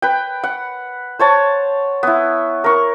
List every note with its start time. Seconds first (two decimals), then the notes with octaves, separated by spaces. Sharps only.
0.02 B4 G5
0.44 F#5
1.19 C5 C#5 A5
2.03 B3 E4
2.64 A#4 C#6